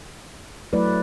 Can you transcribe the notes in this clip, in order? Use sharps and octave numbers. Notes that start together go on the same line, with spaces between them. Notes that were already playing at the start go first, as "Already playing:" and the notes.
F#3 A3 E4 B4 D5